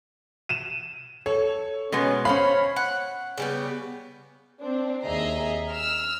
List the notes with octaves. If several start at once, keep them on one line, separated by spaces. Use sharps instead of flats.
D#7 E7
A4 C#5
B2 G#3 B3 C#4
C#4 C5 C#5 F5 B5
F#5
C#3 G3 B3
C4 D4
D#2 G#4 D#5 E5 A#5 C7
E6 F6